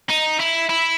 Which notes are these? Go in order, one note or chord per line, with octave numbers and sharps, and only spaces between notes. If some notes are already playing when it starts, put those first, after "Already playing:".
D#4
E4
E4